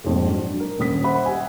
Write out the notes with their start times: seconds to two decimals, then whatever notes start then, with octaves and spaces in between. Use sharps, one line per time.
0.04 A#1 F2 G#2
0.29 F#3 D4
0.60 A#4
0.79 D#1 C#4 D#6 B6
1.04 C5 E5 F#5 B5
1.26 G4 C5 E5 F#5 G#5